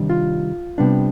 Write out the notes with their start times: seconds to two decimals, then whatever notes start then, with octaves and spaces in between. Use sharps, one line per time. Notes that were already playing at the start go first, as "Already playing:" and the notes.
Already playing: C3 D#3 G3 D4
0.10 F4
0.78 C3 G3 B3 D4